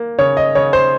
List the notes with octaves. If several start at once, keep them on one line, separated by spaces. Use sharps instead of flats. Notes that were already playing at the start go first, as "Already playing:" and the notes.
Already playing: A#3
C#3 C#5
D#5
C#3 C#5
C5